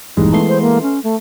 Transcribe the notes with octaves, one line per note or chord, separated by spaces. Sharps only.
A#1 E2 G2 E3 G#3 D#4
A3 B3 C6
C5
A#3
C#4
A3